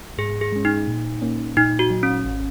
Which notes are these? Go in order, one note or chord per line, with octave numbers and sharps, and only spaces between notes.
G#2 G#4
G#4
G#3 C#4
D#4
A#2
A#3 C#4
A#2 D#4
F#4
F#3 D#4
C#4
G#1